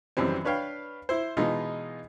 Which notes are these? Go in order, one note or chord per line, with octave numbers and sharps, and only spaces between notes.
G#1 F#2 E3 G3 C4
D4 B4 C#5 F5 G5
E4 C5
B2 E3 G#3 D#4 F4